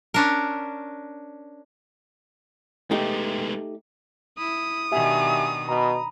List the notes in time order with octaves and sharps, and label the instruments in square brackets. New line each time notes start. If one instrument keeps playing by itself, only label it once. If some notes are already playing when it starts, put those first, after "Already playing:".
[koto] C#4 D4 A#4
[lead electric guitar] G#3 B3 [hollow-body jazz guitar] A3 D#4 G4
[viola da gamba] E4 [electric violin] D#6
[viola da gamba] B2 D#3 D4 [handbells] G4 E5 G#5
[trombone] B2 [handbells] A#5 B5